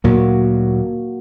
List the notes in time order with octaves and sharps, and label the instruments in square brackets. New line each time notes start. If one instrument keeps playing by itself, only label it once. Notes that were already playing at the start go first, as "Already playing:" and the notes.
[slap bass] D2 A#2 F#3 [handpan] A#3 F#4